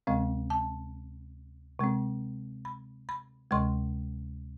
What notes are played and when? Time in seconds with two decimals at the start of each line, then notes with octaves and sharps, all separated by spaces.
0.07 D2 C3 G#3 C4 F5
0.50 A5
1.79 C3 G#3 C4
2.65 B5
3.09 B5
3.51 D2 C3 G#3 C6